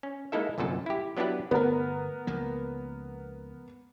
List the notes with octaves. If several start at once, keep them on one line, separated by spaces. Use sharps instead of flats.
C#4
G#3 A#3 D#4 E4 A4 E5
G1 C2 F#2 A#2 A4 A5
E4 G4
F#3 B3 D4 E4 G4 B4
G1 A3 B3 A#4
C#2 F3 A#3